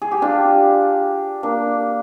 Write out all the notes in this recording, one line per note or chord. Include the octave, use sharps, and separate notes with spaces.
G#4
G4
D4 F4
A#3 D4